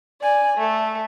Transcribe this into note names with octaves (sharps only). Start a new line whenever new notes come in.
D5 G#5
A3 A4